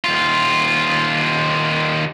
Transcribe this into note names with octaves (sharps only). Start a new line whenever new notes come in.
D#2 F4